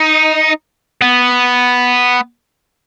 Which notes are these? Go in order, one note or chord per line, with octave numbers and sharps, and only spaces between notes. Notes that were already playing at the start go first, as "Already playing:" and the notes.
Already playing: D#4
B3